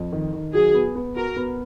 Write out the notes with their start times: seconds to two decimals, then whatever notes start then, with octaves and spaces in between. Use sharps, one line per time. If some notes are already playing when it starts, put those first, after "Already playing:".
Already playing: F2
0.12 D#3
0.33 D#3
0.53 F#3 G#4
0.74 B3
0.96 B3
1.16 F#4 A#4
1.36 B3